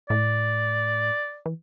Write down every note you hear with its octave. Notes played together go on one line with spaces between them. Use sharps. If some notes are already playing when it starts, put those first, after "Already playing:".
A2 D5
E3